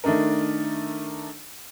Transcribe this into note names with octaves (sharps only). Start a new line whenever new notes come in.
D#3 A3 D4 D#4 A#4